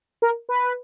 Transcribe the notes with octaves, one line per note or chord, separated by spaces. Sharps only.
A#4
B4